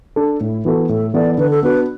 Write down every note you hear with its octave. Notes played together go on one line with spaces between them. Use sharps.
D4 A4
A2 E4
E3 B3 E4 F#4 A4
A2 A4
E3 B3 E4 A4 D5
D3 B4
A4
B3 D4 F#4 B4